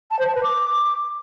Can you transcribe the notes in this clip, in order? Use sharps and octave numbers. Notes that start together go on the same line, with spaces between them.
A5
C5
A5
B4
D6